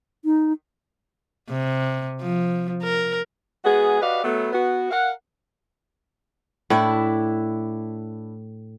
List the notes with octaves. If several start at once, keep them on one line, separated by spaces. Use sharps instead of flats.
D#4
C3
F3
A#4
G#3 B3 F#4 G#4
F#4 G4 B4 D5 D#5 F5
F#3 A3 B3
B3 F#4
A#4 F5 F#5
A2 D4 E4 E5